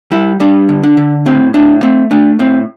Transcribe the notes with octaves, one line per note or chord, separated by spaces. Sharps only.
G3 E4
G3 D4
D3
D4
D3
A2 C4
A2 D4
A3 C4
A3 D4
A2 C4